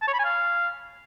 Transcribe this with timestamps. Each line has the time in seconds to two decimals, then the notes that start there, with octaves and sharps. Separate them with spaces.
0.02 A5
0.07 C#5
0.13 B5
0.19 G#5
0.25 F5